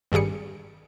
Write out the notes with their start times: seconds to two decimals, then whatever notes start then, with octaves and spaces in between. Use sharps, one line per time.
0.12 G#1 G2 G3 G#4 C#7